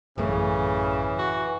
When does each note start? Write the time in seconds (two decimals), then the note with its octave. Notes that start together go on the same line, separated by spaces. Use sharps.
0.18 A1 F#2 C#3 E3 A3
1.19 F#4